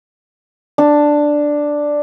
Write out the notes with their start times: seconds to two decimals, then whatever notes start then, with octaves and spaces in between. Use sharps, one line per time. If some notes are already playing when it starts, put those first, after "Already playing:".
0.78 D4